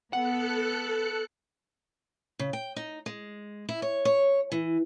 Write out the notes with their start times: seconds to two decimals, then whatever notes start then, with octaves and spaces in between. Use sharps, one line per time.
0.13 B3 A4 F#5 F#6 C#7
2.39 C#3
2.53 G5
2.76 D#4
3.06 G#3
3.69 E4
3.82 C#5
4.05 C#5
4.52 E3